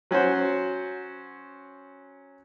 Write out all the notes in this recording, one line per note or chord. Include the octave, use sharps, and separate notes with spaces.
F#3 C#4 F#4 C5